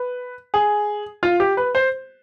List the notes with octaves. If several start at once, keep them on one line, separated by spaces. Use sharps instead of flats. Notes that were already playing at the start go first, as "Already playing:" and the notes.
Already playing: B4
G#4
F4
G4
B4
C5